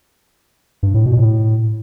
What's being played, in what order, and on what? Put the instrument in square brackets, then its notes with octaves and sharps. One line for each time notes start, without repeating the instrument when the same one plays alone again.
[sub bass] G2
A2
B2
A2